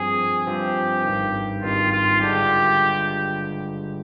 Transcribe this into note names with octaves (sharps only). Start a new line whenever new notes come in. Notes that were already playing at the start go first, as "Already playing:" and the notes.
Already playing: G2 F3 C4 G#4
G2 F3 C4 G4
G#1 G2 D#3
G#1 G2 D#3 F4
F4
G2 D3 G#3 D4 F4 G4